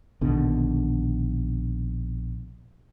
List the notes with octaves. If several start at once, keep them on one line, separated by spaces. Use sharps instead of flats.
A#1 B2 D3 D#3